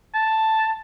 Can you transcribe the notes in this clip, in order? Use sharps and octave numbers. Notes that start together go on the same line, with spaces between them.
A5